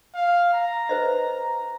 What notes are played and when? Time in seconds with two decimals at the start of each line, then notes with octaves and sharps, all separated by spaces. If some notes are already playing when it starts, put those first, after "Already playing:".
0.15 F5
0.54 A#5
0.89 B4 C5 D#5